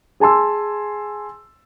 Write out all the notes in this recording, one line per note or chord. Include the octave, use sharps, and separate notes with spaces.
G#4 G#5 A5 C6 E6